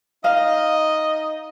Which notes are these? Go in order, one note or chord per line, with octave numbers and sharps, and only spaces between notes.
D#4 D#5 F5